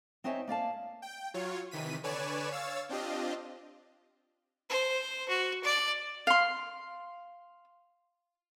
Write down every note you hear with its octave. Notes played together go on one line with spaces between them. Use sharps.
C4 D#4 C5 C#5 E5 G#5
A#3 D5 F5 A5
G5
F#3 F4 C#5
C3 D#3 E3 B6 D#7
D3 B4 C#5 D5 G#5 E7
C#5 F5 E6 A6
C4 D4 F4 G4 D#5
C5
F#4
D5
F5 C6